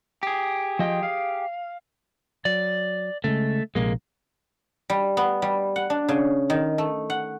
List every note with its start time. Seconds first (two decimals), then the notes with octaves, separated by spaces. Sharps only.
0.23 G4 G#4
0.79 F3 D#5 G5
1.03 F5
2.45 F#3 D5
3.24 C#3 G#3 A3
3.75 A#1 C3 G#3 A#3
4.90 G3
5.17 B3
5.42 G3
5.76 F#5
5.90 D4
6.08 C#3
6.50 D#3
6.78 A3
7.10 F#5